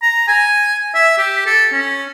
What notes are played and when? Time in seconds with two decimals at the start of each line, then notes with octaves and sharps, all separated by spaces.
0.02 A#5
0.28 G#5
0.95 E5
1.18 G4
1.46 A4
1.72 C#4